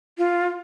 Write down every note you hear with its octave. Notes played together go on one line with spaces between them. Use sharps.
F4